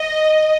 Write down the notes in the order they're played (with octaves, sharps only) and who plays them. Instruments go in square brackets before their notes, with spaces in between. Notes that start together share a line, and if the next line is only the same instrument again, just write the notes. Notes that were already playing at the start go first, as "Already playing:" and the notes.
Already playing: [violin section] D#5